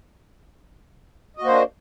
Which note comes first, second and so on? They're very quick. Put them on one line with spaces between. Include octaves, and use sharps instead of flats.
D#5 F#4 A#3 C5 D4